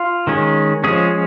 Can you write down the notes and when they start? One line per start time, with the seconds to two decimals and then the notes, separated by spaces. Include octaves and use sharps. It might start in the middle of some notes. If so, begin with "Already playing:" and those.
Already playing: F4
0.27 D#3 G#3 C#4
0.84 F3 G#3 C#4 G#4